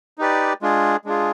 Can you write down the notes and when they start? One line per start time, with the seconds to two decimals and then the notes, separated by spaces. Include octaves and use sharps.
0.18 D#4 G4 B4 D5
0.62 G#3 D4 F4 G#4
1.04 G#3 D4 F4 G#4